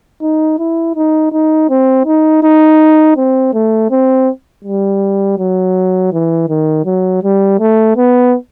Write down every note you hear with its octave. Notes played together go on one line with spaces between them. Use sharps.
D#4
E4
D#4
D#4
C4
D#4
D#4
C4
A3
C4
G3
F#3
E3
D#3
F#3
G3
A3
B3